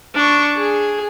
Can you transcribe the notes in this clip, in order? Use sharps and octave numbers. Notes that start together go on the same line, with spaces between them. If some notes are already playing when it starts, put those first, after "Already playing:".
D4 C#6
G#4